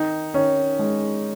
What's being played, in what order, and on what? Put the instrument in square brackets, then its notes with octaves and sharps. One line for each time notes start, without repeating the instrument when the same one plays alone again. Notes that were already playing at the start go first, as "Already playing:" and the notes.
Already playing: [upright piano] D#3 D#4
D#3 C#4
G#3